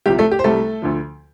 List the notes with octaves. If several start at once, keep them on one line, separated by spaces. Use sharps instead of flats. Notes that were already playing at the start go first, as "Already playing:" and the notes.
C2 C3 F3 G4
A3 A4
G4
C5
C2 C3 G3 A3 A4
D2 D3 F3